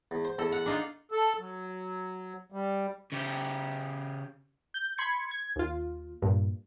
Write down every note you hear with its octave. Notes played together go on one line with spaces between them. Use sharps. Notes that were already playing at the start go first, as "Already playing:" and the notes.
E2
C5
E2 A4
F#5
D4 D#4 F4
A4
F#3
G3
C#3 G4
G6
B5 C6 G#6 C#7
G#6
D#2 F4
G2 A#2